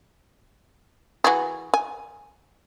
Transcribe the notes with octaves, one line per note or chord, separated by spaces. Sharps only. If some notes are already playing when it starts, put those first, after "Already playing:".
E3 F#4 G#4
G#5